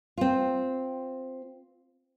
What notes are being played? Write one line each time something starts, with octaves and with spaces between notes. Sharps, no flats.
C4 F4